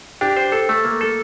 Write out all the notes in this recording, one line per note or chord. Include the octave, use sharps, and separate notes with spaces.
D4 G4
C5
A4
A3
A#3
A4